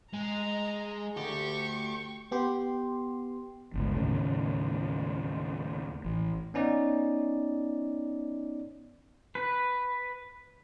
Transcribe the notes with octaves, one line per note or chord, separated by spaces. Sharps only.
G#3 A#5
D2 G4 C#6
B3 G4 C6
G1 C#2
D#2 A2 C#3
A1
B3 C#4 D#4 D5
B4